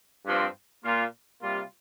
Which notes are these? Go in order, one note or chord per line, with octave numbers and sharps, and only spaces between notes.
G2 F3 C4
A#2 A#3 F4
C3 G3 A#3 F4